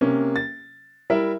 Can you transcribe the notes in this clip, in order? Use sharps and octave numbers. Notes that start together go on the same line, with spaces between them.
C3 A#3 C#4
A6
G3 E4 A#4 E5